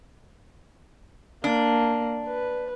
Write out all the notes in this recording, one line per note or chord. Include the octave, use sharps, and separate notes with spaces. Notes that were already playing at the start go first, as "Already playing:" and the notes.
A#3 D4
B4